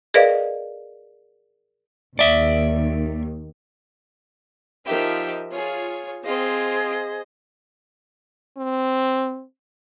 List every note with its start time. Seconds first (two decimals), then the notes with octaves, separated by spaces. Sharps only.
0.14 G#4 A#4 B4 D5 D#5 F5
2.19 D#2 D5 E5
4.86 F3 D#4 G4 A#4 E5
5.52 F4 G#4 C#5
6.24 C4 F4 G#4 C5 D#5
8.57 C4